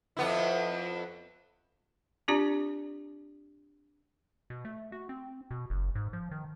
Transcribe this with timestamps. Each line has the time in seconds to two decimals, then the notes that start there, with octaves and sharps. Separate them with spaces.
0.17 F2 B3 E4
2.28 C4 D4 F4 G4 D5 A#5
4.50 B2
4.65 A3
4.92 F#4
5.09 C4
5.51 B2
5.70 F#1
5.95 G#2
6.13 F3
6.31 D#3